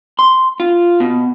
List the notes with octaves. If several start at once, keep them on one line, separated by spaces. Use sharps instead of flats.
C6
F4
B2